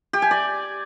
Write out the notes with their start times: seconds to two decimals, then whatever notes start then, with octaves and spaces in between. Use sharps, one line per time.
0.13 G4
0.22 G#5
0.31 D5